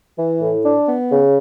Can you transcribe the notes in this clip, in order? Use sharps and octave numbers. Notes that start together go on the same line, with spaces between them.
E3
A2
D4
B3
C#3